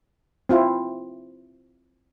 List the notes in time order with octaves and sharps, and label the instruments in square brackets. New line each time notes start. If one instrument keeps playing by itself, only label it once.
[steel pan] C4 E4 F4